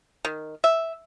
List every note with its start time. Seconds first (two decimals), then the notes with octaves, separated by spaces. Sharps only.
0.25 D#3
0.64 E5